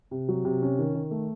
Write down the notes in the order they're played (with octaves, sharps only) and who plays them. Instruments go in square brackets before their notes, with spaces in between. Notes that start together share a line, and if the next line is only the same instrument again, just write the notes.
[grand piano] C3
F#3
C3
C#4
D#3
D#3
A3